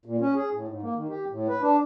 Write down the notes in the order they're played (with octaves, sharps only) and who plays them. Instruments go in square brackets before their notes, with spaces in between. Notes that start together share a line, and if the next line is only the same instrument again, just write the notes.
[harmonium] A#2
C#4
G#4
A2
G#2
A#3
D#3
G4
A2
B4
D4